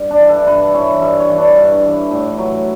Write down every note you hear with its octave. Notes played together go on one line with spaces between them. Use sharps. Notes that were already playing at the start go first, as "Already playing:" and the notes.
Already playing: G2
D4
E3
A4
G2 B4
E3 C#5
G2 E5
C#5
E3
D4
G2
E3
A2
F#3